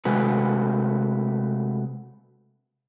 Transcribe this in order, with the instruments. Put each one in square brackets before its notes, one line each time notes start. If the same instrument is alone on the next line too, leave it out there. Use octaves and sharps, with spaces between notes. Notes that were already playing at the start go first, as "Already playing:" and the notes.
[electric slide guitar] C3 G#3 A3 F#4 B4